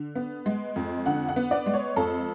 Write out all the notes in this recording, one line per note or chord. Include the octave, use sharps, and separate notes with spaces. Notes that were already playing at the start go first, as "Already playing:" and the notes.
Already playing: D3
B3
G#3
F2
D3 F#5
F#5
B3
D5
G#3
C#5
F2 A4